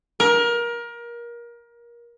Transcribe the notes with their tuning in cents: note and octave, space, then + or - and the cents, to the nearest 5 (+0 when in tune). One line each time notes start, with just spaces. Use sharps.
A#4 +25